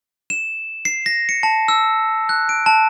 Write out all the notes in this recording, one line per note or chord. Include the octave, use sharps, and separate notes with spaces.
E7
C7
A#6
C#7
A5
E6
F#6
D7
A5